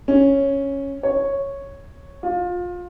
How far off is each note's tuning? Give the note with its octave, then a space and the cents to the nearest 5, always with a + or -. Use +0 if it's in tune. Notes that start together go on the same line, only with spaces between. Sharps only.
C#4 -5
C#5 -5
F4 +25